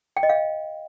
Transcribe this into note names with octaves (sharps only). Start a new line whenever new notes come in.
G5
D#5
F5